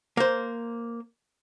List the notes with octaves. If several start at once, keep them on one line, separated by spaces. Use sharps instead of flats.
A#3 C5